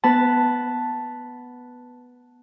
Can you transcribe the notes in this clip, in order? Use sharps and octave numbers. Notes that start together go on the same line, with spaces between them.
B3 B4 A5